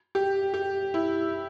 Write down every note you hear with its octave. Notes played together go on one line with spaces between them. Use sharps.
G4
G4
E4